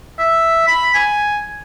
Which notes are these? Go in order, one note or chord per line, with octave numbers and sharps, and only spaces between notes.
E5
B5
G#5